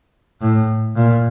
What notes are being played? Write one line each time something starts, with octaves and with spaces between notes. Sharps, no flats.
A2
A#2